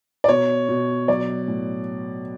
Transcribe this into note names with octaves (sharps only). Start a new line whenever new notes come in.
D5
B2 C#5
B2
F#3 D5
A2